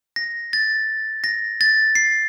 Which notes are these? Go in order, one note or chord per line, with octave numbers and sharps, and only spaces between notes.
A#6
A6
A#6
A6
C7